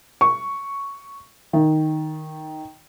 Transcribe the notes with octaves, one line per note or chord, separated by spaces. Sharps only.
C#6
D#3